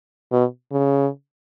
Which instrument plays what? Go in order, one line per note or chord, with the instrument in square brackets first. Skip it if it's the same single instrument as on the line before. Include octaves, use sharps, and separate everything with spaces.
[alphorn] B2
C#3